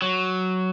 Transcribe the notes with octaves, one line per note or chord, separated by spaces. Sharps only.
F#3